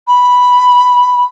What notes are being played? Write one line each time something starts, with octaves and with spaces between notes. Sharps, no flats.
B5